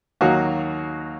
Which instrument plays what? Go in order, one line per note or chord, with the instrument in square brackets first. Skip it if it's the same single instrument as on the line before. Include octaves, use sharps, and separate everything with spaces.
[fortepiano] D#2 D#3 F#3 A#3 F#4